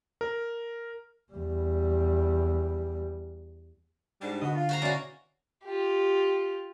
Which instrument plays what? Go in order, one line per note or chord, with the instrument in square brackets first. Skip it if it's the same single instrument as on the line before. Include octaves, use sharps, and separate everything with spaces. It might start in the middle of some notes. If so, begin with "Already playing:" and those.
[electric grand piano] A#4
[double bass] E2 G3
[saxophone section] G#2 G3 [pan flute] D4
[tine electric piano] D3 [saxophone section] B3 F#4 D#5
[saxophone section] F4
[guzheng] F#4 C5 A#5
[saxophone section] B2 E4 D5 [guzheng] C#4 F#4 [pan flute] F5
[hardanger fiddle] F4 G4